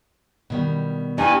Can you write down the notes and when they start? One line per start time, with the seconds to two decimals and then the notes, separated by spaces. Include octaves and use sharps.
0.50 B2 D#3 G3
1.18 G2 D4 E4 G#5